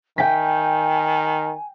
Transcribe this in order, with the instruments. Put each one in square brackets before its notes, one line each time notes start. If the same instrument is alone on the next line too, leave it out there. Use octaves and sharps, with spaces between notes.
[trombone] D#3 [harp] G5 B6 [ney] G#5